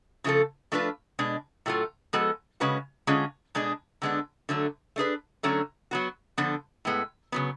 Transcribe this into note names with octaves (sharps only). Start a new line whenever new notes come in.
C#3 F3 A3 F4 A4
F3 A3 D4 F4 B4
B2 G#3 D4
A2 F#3 A3 F4
F3 G#3 B3 F#4 A4
C#3 G#3 C#4 F#4 B4
D3 G#3 C#4 F4 G#4
B2 G#3 D4 G#4
D3 G#3 B3 D4
D3 F#3 A3
A3 D4 G#4 B4
D3 F#3 A3 C#4 F#4
F#3 B3 F#4
D3 F3 B3 D4
A2 G#3 B3
C#3 F#3 B3